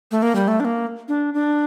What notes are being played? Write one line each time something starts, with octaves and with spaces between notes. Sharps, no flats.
A3
A#3
G3
A3
D4
A#3
D4
D4